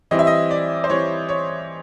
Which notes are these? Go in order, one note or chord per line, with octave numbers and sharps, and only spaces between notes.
E3 G3 C4 E4 D#5
E5
D#5
D5
C5
E3 G3 C4 E4 C#5
C#5